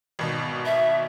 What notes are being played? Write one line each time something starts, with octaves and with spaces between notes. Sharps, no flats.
G#1 B2
E5